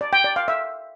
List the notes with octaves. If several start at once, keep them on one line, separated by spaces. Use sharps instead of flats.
D5
G5
D5
F5
E5